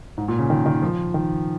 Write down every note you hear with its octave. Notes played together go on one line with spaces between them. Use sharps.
G#2
A#2
C#3
D#3
D#3
F3
D#3